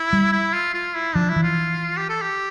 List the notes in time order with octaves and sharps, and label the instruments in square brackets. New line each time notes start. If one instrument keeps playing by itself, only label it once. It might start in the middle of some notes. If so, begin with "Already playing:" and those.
Already playing: [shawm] E4
[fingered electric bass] G3
[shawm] E4
F4
F4
E4
[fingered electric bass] F3 [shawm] D4
[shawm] E4
[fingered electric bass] E3
[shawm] F4
G4
A4
G4